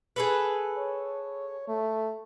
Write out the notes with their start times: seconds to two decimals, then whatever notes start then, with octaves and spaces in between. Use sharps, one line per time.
0.16 G#4 A4 B4
0.78 C#5
1.68 A3